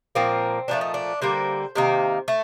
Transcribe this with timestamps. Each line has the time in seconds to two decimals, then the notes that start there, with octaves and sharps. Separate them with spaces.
0.15 A#2 F3 A#3 C4
0.68 A#2 F3 A3 D4
0.81 D#4
0.94 D4
1.22 D3 G3 A#3 C5
1.75 C3 D#3 A#3
2.28 A3